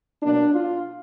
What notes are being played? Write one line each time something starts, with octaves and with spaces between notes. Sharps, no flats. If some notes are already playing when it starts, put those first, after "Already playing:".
B2 F#3 A#3 D4
F4